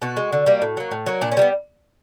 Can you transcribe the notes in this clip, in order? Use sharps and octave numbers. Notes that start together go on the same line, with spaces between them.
B2 F#4
G#3
D3
G3 A#3
A2
F#3 A#3
A2
F#3 A#3
A#2 D4
C#4
G3 A#3 B3